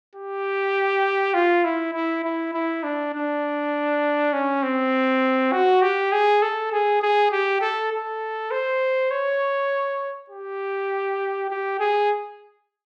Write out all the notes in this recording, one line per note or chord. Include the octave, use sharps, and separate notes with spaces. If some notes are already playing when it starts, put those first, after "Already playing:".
G4
F4
E4
E4
E4
E4
D4
D4
C#4
C4
F#4
G4
G#4
A4
G#4
G#4
G4
A4
A4
C5
C#5
G4
G4
G#4